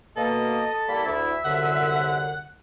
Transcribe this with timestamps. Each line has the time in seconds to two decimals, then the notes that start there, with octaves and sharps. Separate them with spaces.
0.17 B2 A#3 A4 D#5
0.88 G3 A#3 E4 B5
1.05 D2 E4 E5
1.45 C2 F#2 D3 F#5